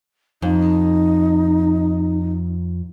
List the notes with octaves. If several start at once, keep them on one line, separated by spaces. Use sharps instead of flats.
F2 D#4